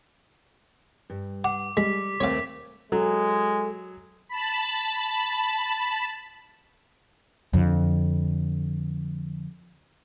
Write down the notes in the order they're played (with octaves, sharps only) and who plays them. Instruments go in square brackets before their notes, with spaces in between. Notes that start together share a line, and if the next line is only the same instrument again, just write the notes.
[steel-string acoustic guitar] G2
[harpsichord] F#5 [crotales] D6
[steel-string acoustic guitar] G3 [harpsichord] G#3 [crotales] B6
[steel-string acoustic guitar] D#2 A3 C4 [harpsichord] C#5 F5
[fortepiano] F#3 [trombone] G#3 [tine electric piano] A4
[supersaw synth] A5 B5
[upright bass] F2 D3